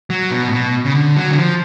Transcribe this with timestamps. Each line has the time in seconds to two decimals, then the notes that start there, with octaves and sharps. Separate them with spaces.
0.10 F#3
0.31 B2
0.48 A2
0.52 B2
0.85 C#3
0.95 D3
1.16 F#3
1.31 D3
1.36 F3